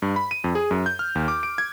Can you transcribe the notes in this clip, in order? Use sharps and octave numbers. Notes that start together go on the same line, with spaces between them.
G2
B5
D#7
F2
G#4
F#2
G6
F6
D#2
D6
D7
G#6